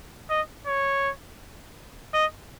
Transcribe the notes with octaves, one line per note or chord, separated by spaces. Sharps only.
D#5
C#5
D#5